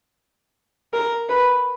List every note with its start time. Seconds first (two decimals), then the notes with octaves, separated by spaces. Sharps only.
0.93 A#4
1.29 B4